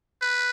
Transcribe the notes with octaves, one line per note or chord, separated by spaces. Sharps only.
B4